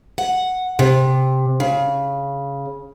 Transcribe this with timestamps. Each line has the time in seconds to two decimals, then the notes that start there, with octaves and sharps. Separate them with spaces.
0.18 F#5
0.79 C3
1.60 C#3